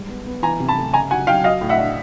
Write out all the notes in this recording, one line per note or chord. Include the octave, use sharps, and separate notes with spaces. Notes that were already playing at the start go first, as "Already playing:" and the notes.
Already playing: G3 G#3
B3
B3
E3 G#5 A#5
C3
A5 B5
A3
C#3 G#5 A#5
F#3 F#5 G#5
F#3 F5 G5
F#3 D#5 F5
A2
E5 F#5
D4